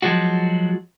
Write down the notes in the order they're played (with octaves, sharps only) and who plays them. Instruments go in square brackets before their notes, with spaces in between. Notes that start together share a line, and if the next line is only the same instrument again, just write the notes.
[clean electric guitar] F3 F#3 G#3 F#4